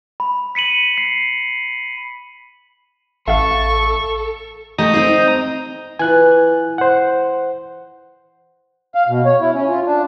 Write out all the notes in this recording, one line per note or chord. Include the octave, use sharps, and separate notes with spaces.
B5
B6 C#7 D#7 F#7
C7
A1 A4 E5 F5 C#6
A3 G4 D#5 A#5 D#6
C4 D#4 C5
E3 F4 G#5 F#6
C5 F#5
F5
B2
C#5
E4
C#4
F4
D4